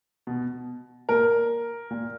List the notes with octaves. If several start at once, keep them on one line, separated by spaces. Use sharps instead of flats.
B2
A#2 A#4
A#2